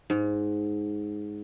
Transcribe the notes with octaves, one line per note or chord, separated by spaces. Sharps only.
G#2